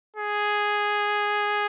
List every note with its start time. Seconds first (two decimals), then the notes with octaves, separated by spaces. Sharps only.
0.16 G#4